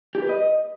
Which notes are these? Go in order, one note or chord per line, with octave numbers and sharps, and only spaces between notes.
G4
B4
D#5